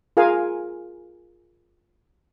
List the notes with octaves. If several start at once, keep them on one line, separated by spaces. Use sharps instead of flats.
F4 G#4 A#4 F5 G#5